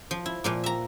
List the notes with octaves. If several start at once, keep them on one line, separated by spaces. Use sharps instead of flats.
F3
E4
A#2 F3 A#3
E5 A#5